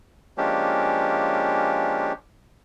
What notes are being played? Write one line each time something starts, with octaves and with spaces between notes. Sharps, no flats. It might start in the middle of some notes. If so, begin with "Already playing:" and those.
F3 G#3 A#3 C#4 D4 G4